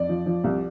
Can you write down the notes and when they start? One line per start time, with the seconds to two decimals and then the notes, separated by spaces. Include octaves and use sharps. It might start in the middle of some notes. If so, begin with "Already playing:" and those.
Already playing: F2 D5
0.09 F3
0.26 F3
0.44 C2